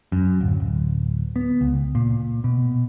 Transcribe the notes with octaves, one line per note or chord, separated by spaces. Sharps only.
F#2
D1
D1
B3
C#2
A#2
B2